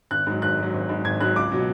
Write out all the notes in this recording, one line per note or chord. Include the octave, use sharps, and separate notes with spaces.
G#1 F#6
G#2 F#3
G#1 F#6
G#2 F#3
G#1
G#2 F#3
G#1 G#6
G#2 F#3 F#6
C#2 D6
B2 F#3